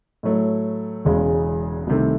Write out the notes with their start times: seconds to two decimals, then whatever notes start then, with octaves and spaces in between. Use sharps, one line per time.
0.23 A2 F#3 A3
1.05 E1 E2 C#3 G#3
1.87 C2 C3 D#3 A3